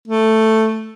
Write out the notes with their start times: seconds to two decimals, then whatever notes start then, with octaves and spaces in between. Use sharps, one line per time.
0.08 A3